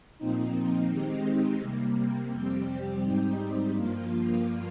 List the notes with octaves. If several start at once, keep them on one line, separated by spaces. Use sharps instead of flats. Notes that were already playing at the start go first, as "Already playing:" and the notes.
A#2 F3 C4 D#4
D#3 G#3 C4 D#4 G4
C3 G3 A#3
F2 C3 G3 C4 G4
G#2 G3 C4 D#4 G4
G2 F3 A#3 F4